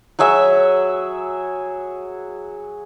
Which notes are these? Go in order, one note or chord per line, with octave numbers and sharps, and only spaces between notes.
F#3 F#4 G#4 E5